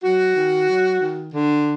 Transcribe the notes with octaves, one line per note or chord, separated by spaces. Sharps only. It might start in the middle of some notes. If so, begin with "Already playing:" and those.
F#3 F#4
D#3
F#3
D#3
D3